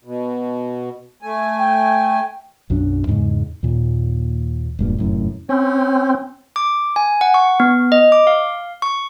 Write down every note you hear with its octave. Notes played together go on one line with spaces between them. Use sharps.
B2
A3 G#5
G5
B1 F#2 F#3 D4
E2 G#2 C#3 G#3
D#2 A#2
E1 G2 A#2
F1 F#2 A2
C4 C#4
D6
G#5
F#5
C#6
B3
D#5
D6
F5
C#6